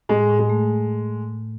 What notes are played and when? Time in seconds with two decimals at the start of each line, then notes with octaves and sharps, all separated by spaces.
0.09 A2 G#3
0.29 A2
0.39 G#3
0.50 A3